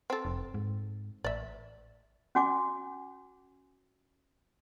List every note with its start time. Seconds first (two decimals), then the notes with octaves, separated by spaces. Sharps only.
0.10 C4 A4
0.25 F1
0.54 G#2
1.24 A1 D5 E5
2.35 C#4 F#4 G#5 D6